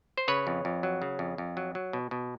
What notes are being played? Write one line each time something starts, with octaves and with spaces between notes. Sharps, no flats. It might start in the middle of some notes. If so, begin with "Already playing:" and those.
C5
C#3 B4 C#5
F2
F2
F#3
C#3
F2
F2
F#3
F#3
B2
B2